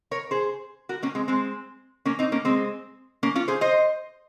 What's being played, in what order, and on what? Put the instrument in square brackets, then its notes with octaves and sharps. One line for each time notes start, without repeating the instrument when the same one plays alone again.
[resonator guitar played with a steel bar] A#4 C#5
G#4 C5
F#4 A#4
A#3 C#4
G#3 C4
G#3 C4
A#3 C#4
C4 D#4
A#3 C#4
G#3 C4
A#3 C#4
C#4 F4
G#4 C5
C5 D#5